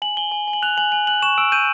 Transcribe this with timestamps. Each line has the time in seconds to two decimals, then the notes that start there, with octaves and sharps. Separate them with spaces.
0.02 G#5 F#7
0.17 G#5 G7
0.32 G#5
0.48 G#5
0.53 F#7
0.63 F#6 F7
0.78 G#5 F#7
0.92 G#5 F#7
1.07 F#6 F#7
1.22 C#6 E7
1.38 E6 D7
1.52 G6 D#7